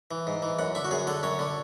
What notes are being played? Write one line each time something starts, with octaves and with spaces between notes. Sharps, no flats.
E3
G#2
E3
F#2 F#5
D3 E5
F#4
F#2 G#4
D3 A4
F#2 C#5
D3